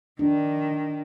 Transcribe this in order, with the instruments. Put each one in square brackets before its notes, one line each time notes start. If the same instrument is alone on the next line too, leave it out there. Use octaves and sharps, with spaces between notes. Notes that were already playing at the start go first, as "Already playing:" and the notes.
[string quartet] D#3 [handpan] D4